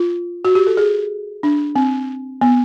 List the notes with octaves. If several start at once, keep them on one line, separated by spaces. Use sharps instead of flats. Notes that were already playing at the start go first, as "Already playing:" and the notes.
Already playing: F4
F#4
G4
A4
G#4
D4
C4
B3